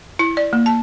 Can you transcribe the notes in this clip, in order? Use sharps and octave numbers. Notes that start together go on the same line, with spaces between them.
E4
D5
A#3
A5